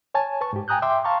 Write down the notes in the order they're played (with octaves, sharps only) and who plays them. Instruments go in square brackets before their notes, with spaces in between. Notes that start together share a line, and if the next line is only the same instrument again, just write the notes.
[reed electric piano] C#5 G#5 A5
B4 A5 C#6
G#2 G4
G5 G#5 A#5 D#6 F#6 G6
E5 G5 C6 D6
F5 A5 A#5 C6 C#6